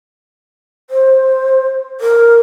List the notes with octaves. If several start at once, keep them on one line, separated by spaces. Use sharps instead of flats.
C5
A#4